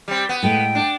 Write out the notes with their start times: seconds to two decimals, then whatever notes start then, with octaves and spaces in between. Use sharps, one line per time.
0.08 G3 C4
0.29 B3
0.43 A2 G#3 A3 G5
0.75 D4